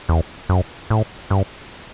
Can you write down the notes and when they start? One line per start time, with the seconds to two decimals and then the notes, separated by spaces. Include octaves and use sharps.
0.09 E2
0.49 F#2
0.90 A2
1.30 G2